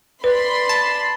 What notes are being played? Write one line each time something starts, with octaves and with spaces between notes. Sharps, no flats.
B4 D5 B5 C6
A5